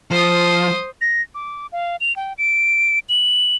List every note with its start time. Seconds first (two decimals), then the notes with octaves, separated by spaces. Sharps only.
0.11 F3 C5 D#6
1.01 A#6
1.35 D6
1.72 F5
2.01 F7
2.16 G5
2.38 D7
3.09 F#7